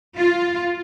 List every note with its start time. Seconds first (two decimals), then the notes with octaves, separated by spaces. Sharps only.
0.17 F4